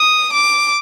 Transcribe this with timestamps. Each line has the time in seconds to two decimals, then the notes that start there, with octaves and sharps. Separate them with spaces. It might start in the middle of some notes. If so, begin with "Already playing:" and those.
Already playing: D#6
0.33 D6